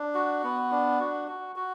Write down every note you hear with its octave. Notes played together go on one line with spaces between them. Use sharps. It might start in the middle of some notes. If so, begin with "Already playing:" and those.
Already playing: D4
F#4
B3
D4
F#4
F#4
F#4